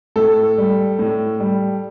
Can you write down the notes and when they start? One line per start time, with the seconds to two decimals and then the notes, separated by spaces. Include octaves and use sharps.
0.16 A2 A4
0.58 G3
0.99 A2
1.40 G3